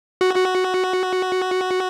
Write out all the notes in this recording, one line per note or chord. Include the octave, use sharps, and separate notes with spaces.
F#4
F#4